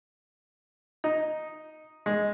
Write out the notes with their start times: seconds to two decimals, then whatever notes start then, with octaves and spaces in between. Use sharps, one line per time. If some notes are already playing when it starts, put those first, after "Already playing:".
1.04 D#4
2.06 G#3